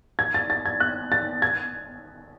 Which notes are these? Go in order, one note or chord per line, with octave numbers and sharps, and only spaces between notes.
G#6
A6
A6
G#6
F#6
A6
G#6